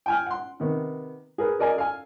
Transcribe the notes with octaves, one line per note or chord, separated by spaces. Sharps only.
G5 G#5 F6
F#5 C6
C3 D#3 B3
G#4 A#4 B4
F#4 A#4 D5 D#5 G#5
A4 F5 G#5